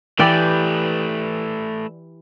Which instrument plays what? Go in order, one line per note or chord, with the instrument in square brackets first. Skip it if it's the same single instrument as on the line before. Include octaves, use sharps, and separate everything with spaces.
[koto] E3 G4 D5 [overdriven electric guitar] A3 B4